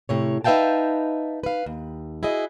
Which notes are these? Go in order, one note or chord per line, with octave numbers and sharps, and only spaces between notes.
A2 C3 C#5
D#4 B4 E5 F5 G5 A5
B4 F5
D#2
E4 F#4 G#4 D#5